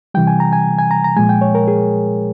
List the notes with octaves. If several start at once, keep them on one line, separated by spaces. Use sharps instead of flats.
C3 E3 G3 G5
G#5
A#5
G#5
G#5
A#5
A#5
A#2 F3 G#3 G#5
G5
C#5
A#4
G#4